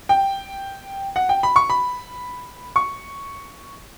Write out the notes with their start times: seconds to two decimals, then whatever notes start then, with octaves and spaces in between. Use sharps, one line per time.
0.09 G5
1.16 F#5
1.29 G5
1.43 B5
1.56 C#6
1.70 B5
2.76 C#6